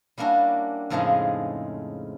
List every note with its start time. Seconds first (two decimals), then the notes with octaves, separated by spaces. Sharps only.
0.18 G3 A#3 C#4 D4 E4 F#4
0.90 F2 A2 C#3 F3 G#3 D#4